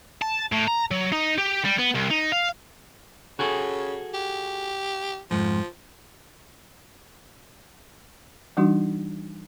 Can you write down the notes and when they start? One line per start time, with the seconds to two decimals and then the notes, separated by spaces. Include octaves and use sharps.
0.22 A5
0.52 A2
0.68 A#5
0.91 F#3
1.12 D#4
1.38 G4
1.65 G3
1.78 B3
1.94 C2
2.10 D#4
2.32 F5
3.39 C#3 F#4 G#4 A4
4.14 G4
5.31 F2 G#2 F3
8.57 E3 G3 D4 D#4 F#4